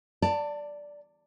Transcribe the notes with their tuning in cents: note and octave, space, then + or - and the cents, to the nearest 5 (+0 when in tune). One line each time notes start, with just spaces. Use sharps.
D5 -5 A5 +25